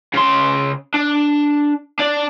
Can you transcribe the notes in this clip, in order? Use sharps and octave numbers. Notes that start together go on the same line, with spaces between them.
C#3 C6
D4
D4 D5